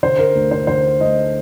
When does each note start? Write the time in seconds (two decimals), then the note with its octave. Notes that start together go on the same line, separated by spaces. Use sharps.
0.03 D3 C5
0.19 A#4
0.35 D2
0.51 C5
0.67 D3 C5
1.00 A3 D#5